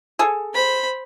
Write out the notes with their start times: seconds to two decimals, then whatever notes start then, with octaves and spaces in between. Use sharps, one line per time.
0.19 G#4 A4
0.54 C5 B5